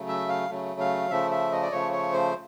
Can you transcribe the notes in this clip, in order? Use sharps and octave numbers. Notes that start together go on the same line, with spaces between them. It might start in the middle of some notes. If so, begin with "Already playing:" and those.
Already playing: C#3 F#3 A3
E5
F5
C#3 F#3 A3
F5
C#3 F3 A3 E5
E5
D#5
D5
C#3 F3 A3 C#5
C#5
C5